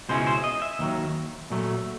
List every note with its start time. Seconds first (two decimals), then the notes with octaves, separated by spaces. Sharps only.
0.09 C#2 B2 G#3 C#4 E4 C5
0.27 C5
0.44 D#5
0.62 E5
0.79 D#2 D#3 F#3
1.50 A#2 F#3 A3